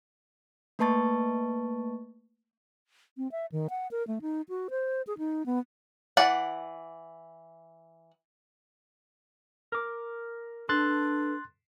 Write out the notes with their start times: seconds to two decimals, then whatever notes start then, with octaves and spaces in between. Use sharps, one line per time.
0.79 A3 A#3 B4 A5 C#6 A6
3.17 C4
3.32 E5
3.52 D#3
3.70 F#5
3.91 A#4
4.08 A3
4.22 D#4
4.49 F#4
4.70 C5
5.07 G#4
5.18 D#4
5.46 B3
6.17 E3 D5 F#5
9.72 A#4 D6
10.69 D4 A4 B4 C6 F#6 A6